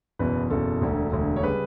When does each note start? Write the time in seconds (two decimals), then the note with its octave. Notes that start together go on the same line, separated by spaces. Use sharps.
0.19 F#1 E2 B2 B4
0.50 F#1 E2 B2 A4
0.81 E1 D2 D3
1.12 E1 D2 D3
1.36 C#5
1.43 C#3 G3 B4